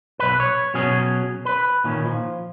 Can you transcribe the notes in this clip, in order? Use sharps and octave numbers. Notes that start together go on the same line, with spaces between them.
B1 B4
C#5
B2 F#3 C#4 G#4
B4
A#2 D#3 C#4
F3